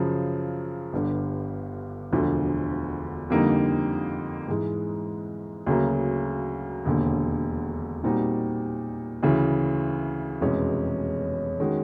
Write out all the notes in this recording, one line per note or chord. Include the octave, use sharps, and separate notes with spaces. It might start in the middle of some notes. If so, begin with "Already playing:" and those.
Already playing: F#2 C#3 F3
G1 G2 D3
E1 D2 D3 F3
F2 D3 G3 A#3 D#4
G#2 E3 G#3
D2 C#3 F#3 A#3
E1 D#2 D3
A#2 G3 C4 D#4 F#4
D2 C#3 E3
F1 E2 B2 G#3 C#4
D#3 G#3 C#4 F#4